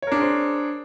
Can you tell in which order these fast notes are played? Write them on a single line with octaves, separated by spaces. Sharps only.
C#5 A#4 D4 G#4 C5